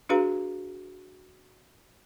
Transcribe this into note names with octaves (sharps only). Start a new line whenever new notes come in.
D4 F#4 G#4 B4 F5 A#5